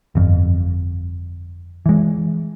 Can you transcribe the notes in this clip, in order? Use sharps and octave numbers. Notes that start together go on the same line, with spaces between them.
G1 F2
E3 G#3